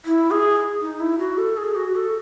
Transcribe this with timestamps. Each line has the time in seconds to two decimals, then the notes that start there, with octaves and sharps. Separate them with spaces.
0.06 E4
0.31 G#4
0.81 D#4
1.00 E4
1.19 F#4
1.38 A4
1.57 G#4
1.75 F#4
1.95 A4